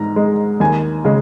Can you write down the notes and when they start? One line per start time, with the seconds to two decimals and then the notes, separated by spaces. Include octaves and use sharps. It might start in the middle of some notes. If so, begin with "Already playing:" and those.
Already playing: G#2 A#5
0.16 G#3
0.60 D#2 G#5
1.04 C#3 G#3